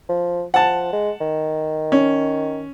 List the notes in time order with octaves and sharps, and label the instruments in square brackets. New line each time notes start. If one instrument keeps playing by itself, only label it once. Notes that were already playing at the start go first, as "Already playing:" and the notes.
[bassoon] F3
[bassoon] F3 [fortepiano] F#5 A5
[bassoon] G#3
D#3
[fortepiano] C#4